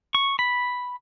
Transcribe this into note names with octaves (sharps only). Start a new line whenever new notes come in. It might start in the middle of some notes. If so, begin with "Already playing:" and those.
C#6
B5